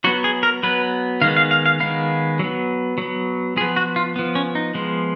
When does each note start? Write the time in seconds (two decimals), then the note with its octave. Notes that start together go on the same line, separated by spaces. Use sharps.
0.04 F#3 B3 F#4
0.24 G#4
0.43 A#4
0.63 F#3 B3 B4
1.21 D#3 G#3 B3 F5
1.37 F5
1.51 F5
1.66 F5
1.80 D#3 G#3 B3 F5
2.39 F#3 B3
2.98 F#3 B3
3.56 F3 G#4
3.61 B3
3.76 F#4
3.96 F4
4.16 F3 B3
4.35 C#4
4.55 D#4
4.74 F3 G#3 B3